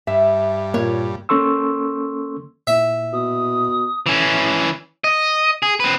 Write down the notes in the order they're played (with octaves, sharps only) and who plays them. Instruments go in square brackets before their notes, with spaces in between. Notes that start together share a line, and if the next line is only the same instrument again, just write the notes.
[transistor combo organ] G2 [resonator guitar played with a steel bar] E5
[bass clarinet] A#2 [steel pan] A#3 [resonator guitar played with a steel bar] C#5
[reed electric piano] A#3 C#4 A4 C6 C#6 E6
[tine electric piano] A#2 A#3 E4 [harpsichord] E5
[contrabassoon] B2 [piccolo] D#6
[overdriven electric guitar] E3 C#4
D#5
G#4
C4 B4